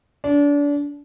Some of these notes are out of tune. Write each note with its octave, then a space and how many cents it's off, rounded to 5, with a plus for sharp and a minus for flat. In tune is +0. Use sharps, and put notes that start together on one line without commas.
D4 -30